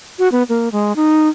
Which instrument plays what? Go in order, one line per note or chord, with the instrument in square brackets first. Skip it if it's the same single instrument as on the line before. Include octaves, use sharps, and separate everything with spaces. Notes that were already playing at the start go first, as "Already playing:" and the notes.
[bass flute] F#4
B3
A#3
G#3
D#4